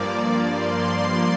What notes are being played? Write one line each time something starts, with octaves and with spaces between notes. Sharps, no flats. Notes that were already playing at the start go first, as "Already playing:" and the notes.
Already playing: G2 F3 A#3 D5
C6